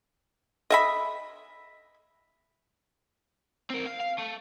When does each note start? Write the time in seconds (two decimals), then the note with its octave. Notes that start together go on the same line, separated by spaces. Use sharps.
0.70 D#5 E5 B5
3.70 C4 A#4
3.86 F5
4.00 F5
4.19 A3